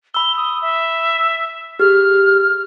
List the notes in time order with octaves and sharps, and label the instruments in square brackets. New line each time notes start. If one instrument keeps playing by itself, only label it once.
[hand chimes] B5 E6 [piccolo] G7
[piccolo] D#6
E5
[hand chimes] G4 G#4 [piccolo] F6